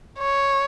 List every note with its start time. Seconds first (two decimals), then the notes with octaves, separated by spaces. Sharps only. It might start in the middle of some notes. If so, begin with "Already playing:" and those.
0.19 C#5